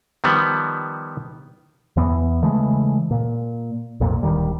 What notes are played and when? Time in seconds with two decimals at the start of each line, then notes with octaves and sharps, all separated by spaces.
0.24 D#3 F3 G3 B3
1.96 E2 E3 B3
2.42 C#3 E3 G#3 A3
3.11 A#2
4.00 B1 F2 A#2
4.23 D1 D2 D#3 G3